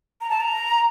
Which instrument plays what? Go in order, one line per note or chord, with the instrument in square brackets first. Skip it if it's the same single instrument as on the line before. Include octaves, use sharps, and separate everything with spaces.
[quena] A#5
A5
A#5